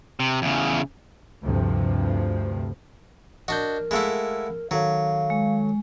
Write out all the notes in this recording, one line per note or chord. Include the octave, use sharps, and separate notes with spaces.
C3
E2 C#3
D2 G2 C3 F3
D4 F#4 A#4 D#5 G6
G#3 A3 E4 F5 F#5 B5
D#3 F#3 A4 C#5 F5
G#3